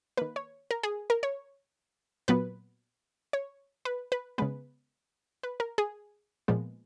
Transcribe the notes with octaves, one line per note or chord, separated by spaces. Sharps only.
D#3 A#3 B4
C#5
A#4
G#4
A#4
C#5
A#2 F#3 B3 B4
C#5
B4
B4
C#3 G#3 B3 B4
B4
A#4
G#4
A#2 F3 G#3 B3